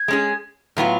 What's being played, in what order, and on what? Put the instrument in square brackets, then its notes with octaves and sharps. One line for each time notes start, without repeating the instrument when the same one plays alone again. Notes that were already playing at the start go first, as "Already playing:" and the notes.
Already playing: [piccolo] G#6
[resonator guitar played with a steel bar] G#3 C#4 G#4
A2 F#3 B3 F4